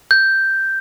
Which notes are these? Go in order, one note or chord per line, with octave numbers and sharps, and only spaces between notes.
G6